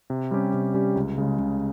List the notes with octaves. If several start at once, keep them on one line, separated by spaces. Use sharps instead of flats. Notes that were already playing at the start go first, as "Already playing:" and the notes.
C3
G3 C#4 G4
C3
G3 C#4 G4
C#2
C#3 G#3
C#2